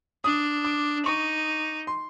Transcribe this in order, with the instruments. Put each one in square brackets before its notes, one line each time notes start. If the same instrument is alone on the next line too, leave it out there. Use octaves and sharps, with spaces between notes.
[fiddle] D4 [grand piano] D#6
[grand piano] D6
[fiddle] D#4 [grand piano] C#6
[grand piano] C6